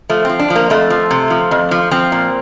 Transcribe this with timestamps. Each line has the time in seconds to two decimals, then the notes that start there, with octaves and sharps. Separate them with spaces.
0.09 F3 A3
0.25 F3 C4
0.39 D4
0.50 F3
0.55 A#3
0.70 F2 A3
0.90 F3
1.11 C3
1.30 F3
1.51 F2
1.71 F3
1.91 F3 C4
2.12 A#2